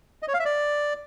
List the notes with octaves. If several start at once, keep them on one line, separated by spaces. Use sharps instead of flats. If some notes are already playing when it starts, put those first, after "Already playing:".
D#5
C#5
F5
E5
D5